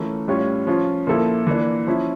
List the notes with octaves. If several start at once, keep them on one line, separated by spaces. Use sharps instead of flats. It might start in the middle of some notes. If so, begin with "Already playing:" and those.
Already playing: E3 A3 C#4 F4 A#4
A2 G3 C#4 F4 C#5
F3 C#4 F4
A#2 F3 A#3 E4 A4
E3 A#3 D4
F3 C#4 E4